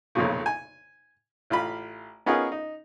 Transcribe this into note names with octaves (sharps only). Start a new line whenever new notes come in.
B1 F2 A#2 C#3
G#5
A1 F4 B5
B3 C#4 D#4 F4 G#4 A#4
D#4